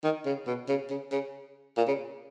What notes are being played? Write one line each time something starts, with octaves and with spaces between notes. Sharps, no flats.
D#3
C#3
B2
C#3
C#3
C#3
A#2
C#3